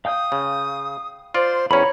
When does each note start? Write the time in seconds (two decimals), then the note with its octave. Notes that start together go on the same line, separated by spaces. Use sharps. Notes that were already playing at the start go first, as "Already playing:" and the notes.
0.05 F5 G5 D#6 G6
0.32 C#3
1.34 F4 C5 D5
1.71 E2 C#4 C#5 A#5 B5